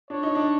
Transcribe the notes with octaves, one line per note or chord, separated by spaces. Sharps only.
D4 C#5
D#4
D4